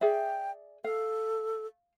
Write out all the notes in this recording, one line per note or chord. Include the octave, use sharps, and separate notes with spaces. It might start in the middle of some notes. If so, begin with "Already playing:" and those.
G#4 D5 E5 G5
A4 F5